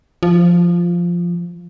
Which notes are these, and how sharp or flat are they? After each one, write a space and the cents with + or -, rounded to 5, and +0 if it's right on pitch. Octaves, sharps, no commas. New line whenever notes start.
F3 -5